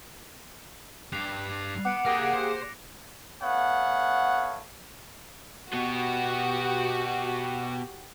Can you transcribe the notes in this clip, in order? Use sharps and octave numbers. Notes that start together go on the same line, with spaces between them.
G2 G4 F#6 C7 F7
B3 F#5 D6 C#7 D7
A#3 G4 G#4 F5 G#5 D6 A#6 D7
C5
A3 B3 C#5 F5 F#5
B2 B3 F#4 G4